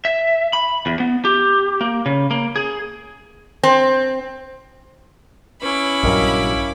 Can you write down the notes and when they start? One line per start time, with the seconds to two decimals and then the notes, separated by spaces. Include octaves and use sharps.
0.05 E5
0.53 B5
0.86 E2
1.00 B3
1.25 G4
1.81 A#3
2.06 C#3
2.31 A#3
2.56 G#4
3.63 C4
5.63 C#4 E4 B4 B5 D6
6.03 A#1 G2 F#3 A#4 D#5 F5